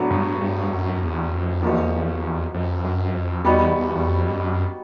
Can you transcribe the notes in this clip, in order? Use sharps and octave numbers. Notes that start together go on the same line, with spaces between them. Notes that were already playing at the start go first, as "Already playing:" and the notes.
Already playing: A2 F#3 B3 D4 F#4
G2
G2
F#2
E2
F2
E2 F3 A#3 D#4 F#4
F2
F#2
F2
E2 G3 B3 D#4 F#4
E2
E2
F2
G2
F#2